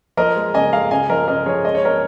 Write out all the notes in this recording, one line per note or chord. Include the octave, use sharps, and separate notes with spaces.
F3 A#4 D#5
G#3
C#3 D#5 G#5
G#3 F5 A#5
C#3 D#5 G#5
F3 A#4 D#5
C#3 A#4 D#5
F3 G#4 C#5
G#3 D#5
C#5
G#3 A#4 D#5